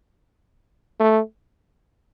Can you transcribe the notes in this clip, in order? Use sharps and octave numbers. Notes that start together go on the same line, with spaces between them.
A3